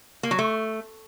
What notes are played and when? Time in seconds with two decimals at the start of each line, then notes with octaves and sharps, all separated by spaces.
0.23 A#3
0.31 F#3
0.39 A3